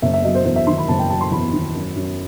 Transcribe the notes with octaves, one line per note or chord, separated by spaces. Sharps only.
F#1 E5
E5
F#3 D#5
C5
E2 C5
E5
D#3 C6
B5
F#1 A5
G5
F#3 A5
C6
E2 B5
D#3
F#2
F#2